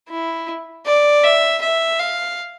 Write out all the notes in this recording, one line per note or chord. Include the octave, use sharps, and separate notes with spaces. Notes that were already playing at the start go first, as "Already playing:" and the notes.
E4
D5
E5
E5
F5